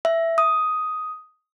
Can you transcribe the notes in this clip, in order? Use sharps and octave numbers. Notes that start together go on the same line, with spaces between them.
E5
D#6